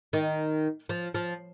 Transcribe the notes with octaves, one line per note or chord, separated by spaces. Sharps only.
D#3
F3
F3